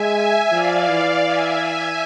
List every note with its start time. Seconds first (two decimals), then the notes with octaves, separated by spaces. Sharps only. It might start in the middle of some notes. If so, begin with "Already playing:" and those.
Already playing: G#3 E5 G#5
0.50 F3 D5 F5
0.87 E3
1.25 E5 G#5
1.61 E5 G#5